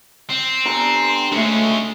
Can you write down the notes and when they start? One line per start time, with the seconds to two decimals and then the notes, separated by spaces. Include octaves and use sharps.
0.30 C4
0.65 D4 G4 A#5
1.32 D3 G#3 A3 C#4